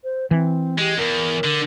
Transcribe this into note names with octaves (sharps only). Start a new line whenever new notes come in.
C5
E3 C4
G#3 G4
E2 A#4
D3